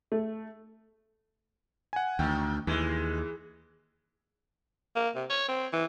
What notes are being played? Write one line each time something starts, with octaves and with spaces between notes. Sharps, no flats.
A3
F#5 G#5
D2 D#3 G5
D#2 E3 G#3
A#3
C3
C#5
C4
E3